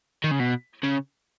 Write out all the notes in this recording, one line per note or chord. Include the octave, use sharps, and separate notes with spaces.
D#3
C#3
B2
C#3